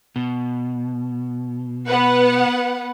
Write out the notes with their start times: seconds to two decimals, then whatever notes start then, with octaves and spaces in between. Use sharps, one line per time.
0.16 B2
1.87 B3 B4 F#5